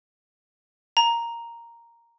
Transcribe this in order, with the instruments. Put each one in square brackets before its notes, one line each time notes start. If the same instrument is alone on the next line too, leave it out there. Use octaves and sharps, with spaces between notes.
[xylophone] A#5